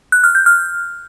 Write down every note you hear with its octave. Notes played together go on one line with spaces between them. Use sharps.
F#6
F6
G6
F6